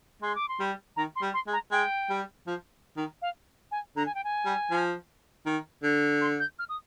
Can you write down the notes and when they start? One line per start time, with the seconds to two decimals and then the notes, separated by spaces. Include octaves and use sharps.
0.22 G#3 C6
0.35 D6
0.49 C6
0.60 G3
0.97 D#3 A#5
1.16 C6
1.22 G3
1.34 C6
1.47 G#3
1.53 A#5
1.71 G#3 G5
2.09 G3
2.47 F3
2.97 D#3
3.22 F5
3.71 G#5
3.96 D3 A#5
4.06 G#5
4.15 G5
4.24 G#5
4.46 G3
4.71 F3
5.46 D#3
5.83 D3
6.21 C6
6.40 G6
6.59 F6
6.69 D#6